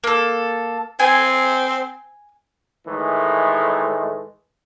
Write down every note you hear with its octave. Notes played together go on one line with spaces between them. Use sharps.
A#3 A4
C4 G#5
A2 D#3 E3 G#3 A3